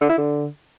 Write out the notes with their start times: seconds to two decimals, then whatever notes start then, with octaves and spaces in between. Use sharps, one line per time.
0.01 D3
0.09 E4
0.18 D3